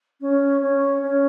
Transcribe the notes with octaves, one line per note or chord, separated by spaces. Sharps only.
C#4
C#4
C#4